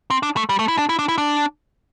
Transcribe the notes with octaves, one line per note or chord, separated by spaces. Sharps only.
C4
D4
A3
G3
A3
E4
D4
E4
D4
E4
D4